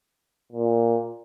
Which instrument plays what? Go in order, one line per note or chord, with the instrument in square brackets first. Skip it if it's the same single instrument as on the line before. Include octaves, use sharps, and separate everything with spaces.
[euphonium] A#2